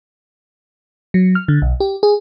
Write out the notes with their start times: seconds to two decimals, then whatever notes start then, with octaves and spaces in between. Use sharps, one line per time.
1.14 F#3
1.35 F6
1.48 D3
1.62 B1
1.80 G4
2.03 G#4